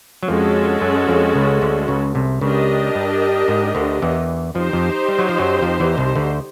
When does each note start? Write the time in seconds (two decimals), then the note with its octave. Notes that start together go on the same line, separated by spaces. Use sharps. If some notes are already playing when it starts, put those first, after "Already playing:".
0.23 F#3
0.28 F2 F3 G#3 C#4 F#4 A4
0.81 F#2 F#3
1.08 F2 F3
1.35 C#2 C#3
1.62 D2 D3
1.88 C#2 C#3
2.15 C2 C3
2.41 C#2 C#3 D4 G4 A#4 D#5
2.95 G2
3.48 G#2
3.75 D2 D3
4.02 E2 E3
4.55 F2 F3 D#4 G4 C5
4.73 F2 F3
5.08 G3
5.19 F#3
5.29 F3
5.38 F#2 F#3
5.62 F2 F3
5.80 E2 E3
5.98 C2 C3
6.16 D2 D3